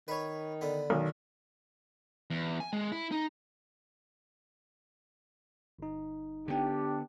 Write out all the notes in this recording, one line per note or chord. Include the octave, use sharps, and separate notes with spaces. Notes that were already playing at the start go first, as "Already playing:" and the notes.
D#3 B4 C#5
D3 B3
B1 D#3
E2
G#5
G#3
E4
D#4
G1 D#4
D3 B3 D4 G4